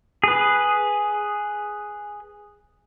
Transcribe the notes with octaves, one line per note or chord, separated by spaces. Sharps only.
G#4 B4